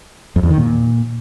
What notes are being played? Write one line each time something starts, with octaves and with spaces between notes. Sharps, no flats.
F2
E2
D#3
A#2